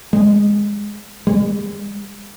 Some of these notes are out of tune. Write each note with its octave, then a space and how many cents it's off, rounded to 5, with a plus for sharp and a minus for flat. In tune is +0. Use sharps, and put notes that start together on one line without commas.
G#3 -15
G#3 -40